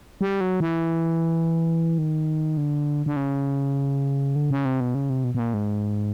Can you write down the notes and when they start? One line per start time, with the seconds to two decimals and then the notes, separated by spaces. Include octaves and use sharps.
0.21 G3
0.41 F#3
0.60 E3
1.98 D#3
2.57 D3
3.06 D3
3.16 C#3
4.36 D3
4.51 C#3
4.65 C3
4.80 B2
4.95 C#3
5.10 C3
5.24 B2
5.35 B2
5.39 A#2
5.54 G#2